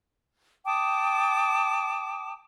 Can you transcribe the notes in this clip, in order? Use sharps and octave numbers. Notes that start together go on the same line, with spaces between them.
G5 A5 D6 D#6